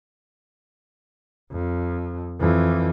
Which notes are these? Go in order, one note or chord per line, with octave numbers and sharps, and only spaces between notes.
F2
F2 E3